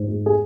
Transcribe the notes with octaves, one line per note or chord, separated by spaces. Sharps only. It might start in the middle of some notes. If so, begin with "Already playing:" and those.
Already playing: G#2
G#3
G#4